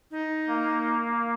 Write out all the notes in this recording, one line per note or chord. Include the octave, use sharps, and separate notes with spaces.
D#4
A#3